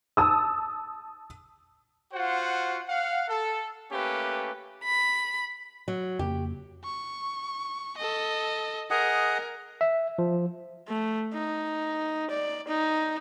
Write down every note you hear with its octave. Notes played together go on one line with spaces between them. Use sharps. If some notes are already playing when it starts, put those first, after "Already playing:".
A5 D#6 E6
F4 F#4 C5 F#5
F5 F#5
A4
A3 A#3 C#4 G4 B4
B5
F#3
F2 C#3 A#3 G4
C#6
A4 D#5
G#4 A#4 D#5 F#5
E5
F3
A3
D#4
D5
D#4